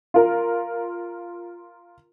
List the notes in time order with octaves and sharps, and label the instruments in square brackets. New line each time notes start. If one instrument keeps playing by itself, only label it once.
[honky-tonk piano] F4 A#4